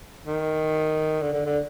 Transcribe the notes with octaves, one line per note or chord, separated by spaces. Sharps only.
D#3
D3
D3
D3